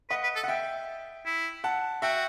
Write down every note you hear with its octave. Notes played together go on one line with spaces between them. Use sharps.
B4 D#5 F#5
B4
A4
F#5
E5 G5
E4
F#5 A5
F#4 E5 G5